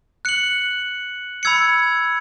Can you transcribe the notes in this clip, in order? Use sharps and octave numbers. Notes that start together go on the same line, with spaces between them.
F#6 C#7 F#7
B5 E6 G#6 C#7